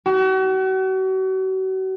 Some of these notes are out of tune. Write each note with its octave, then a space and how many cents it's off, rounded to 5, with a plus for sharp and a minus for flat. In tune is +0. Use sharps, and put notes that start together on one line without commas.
F#4 +40